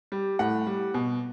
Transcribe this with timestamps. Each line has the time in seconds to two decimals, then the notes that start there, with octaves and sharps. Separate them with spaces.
0.12 G3
0.39 A2 F#5
0.67 G3
0.94 B2